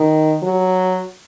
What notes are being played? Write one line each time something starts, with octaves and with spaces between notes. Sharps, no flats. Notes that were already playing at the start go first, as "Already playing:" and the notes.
Already playing: D#3
F#3